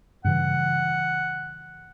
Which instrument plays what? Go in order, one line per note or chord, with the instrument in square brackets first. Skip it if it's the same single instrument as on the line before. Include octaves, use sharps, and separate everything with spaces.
[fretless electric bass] G2 C#3 E3 [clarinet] F#5